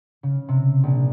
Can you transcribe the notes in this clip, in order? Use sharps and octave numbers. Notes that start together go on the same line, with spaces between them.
C#3
C3
A#1